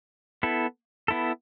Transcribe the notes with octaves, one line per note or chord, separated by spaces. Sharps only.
B3 E4 A4
B3 E4 A4